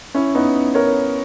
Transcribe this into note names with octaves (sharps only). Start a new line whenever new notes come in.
C#4 E4
B3 D#4
A#4 C#5